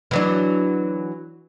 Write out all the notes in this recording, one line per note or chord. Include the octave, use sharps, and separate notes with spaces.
E3 F#3 D4